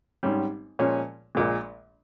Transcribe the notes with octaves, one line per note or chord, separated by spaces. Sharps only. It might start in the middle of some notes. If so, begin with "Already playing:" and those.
G#1 G#2 G3 C#4
A#2 F3 G#3 C#4
A#1 A#2 G#3